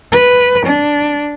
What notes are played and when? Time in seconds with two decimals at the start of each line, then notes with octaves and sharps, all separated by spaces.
0.12 B4
0.66 D4